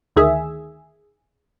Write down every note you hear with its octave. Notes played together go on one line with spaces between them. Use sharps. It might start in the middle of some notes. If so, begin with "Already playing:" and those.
D2 D#3 G#4 E5